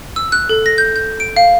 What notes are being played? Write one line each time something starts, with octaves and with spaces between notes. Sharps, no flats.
E6
F#6
A4
A#6
G6
G6
D7
F5